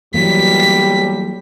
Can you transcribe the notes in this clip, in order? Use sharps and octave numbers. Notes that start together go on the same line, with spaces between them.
B1 E3 F#3 G3 A#3 B6